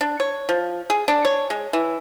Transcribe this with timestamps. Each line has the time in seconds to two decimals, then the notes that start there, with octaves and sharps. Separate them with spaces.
0.01 D4
0.20 C#5
0.49 F3
0.90 G#4
1.08 D4
1.25 C#5
1.50 G#3
1.73 E3